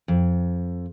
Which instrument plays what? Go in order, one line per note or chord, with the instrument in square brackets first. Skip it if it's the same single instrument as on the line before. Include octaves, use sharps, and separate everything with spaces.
[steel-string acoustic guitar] F2